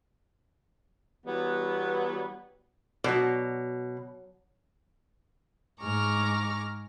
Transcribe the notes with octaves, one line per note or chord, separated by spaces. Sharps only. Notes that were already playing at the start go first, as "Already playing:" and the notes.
E3 F#3 G3 B3
B2 F#3 D5
G#2 G#4 A#5 C#6 D6 F6